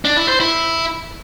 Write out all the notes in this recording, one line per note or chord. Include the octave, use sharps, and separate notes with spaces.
D4
E4
C5
E4